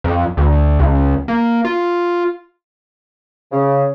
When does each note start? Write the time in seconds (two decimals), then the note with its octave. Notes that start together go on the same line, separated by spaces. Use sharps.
0.04 F2
0.37 D2
0.79 C#2
1.28 A#3
1.65 F4
3.52 C#3